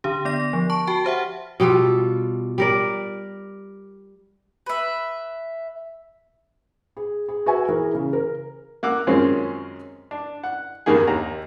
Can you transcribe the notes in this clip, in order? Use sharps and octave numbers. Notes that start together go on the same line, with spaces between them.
D3 D4 G4
B3 D5 A#6
F3
A5 C#6
F#4 G5 A5
G4 C5 E5 F#5
B2 G3 F4 A4
G3 A#4 D5
B4 E5
G#4
G#4
F#4 B4 E5 G#5
E3 G#4 A#4
C#3
A#4
A#3 F#5 D6 E6
F#2 D#3 G#3 C4 C#4 F4
D4
F#5
E2 G2 D#3 A#3 D#4 G#4
D#2 A#5